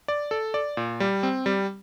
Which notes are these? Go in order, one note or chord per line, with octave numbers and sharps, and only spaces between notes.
D5
A4
D5
A#2
G3
C4
G3